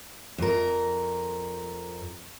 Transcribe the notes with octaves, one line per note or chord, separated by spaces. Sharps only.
F2 A#4